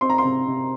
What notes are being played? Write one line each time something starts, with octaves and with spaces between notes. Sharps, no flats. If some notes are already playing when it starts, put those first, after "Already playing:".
C4 C6
A#5
C6
C3
C3